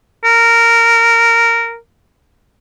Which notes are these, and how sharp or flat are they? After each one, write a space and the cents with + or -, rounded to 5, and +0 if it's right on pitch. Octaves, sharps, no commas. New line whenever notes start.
A#4 -10